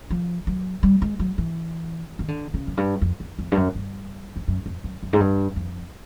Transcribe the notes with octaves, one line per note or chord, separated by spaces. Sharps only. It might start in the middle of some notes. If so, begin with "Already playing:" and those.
F3
F#3
G3
G#3
F#3
E3
D#3
D3
C#3
F#2
G2
F2
F2
F2
G2
F#2
G2
F2
F#2
F2
F#2
F#2
G#2
G2
F2